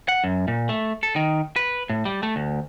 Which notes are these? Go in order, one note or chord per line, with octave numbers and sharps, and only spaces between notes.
F#5
F#2
A#2
A3
A4
D#3
B4
A2
G3
A3
D2